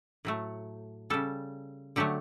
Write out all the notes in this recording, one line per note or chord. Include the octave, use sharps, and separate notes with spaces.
A2 F#3 A3
C#3 G3 A4
D3 F#3 A3 G4